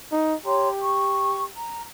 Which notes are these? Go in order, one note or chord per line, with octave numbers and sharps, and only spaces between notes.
D#4
G4 C#5 A#5 C6
C#6
A#5